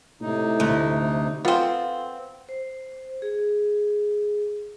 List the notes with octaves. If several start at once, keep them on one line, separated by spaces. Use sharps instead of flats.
A2 C3 D#4
D2
B3 C4 F4 A4 F5
C5
G#4